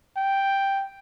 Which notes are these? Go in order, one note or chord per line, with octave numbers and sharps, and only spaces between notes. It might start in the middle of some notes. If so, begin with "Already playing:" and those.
G5